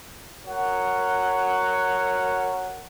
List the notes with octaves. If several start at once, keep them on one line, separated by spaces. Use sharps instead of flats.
F#4 A#4 C#5 F#5